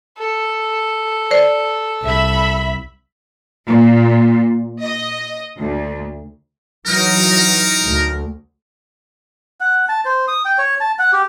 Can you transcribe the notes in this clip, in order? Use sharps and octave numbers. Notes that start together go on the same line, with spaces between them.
A4
C5 D5
C2 E5 B5
A#2
D#5
D2
E3 F#3 D#4 A#4
D2
F#5
A5
C5
D#6
G5
C#5
A5
F#5
G4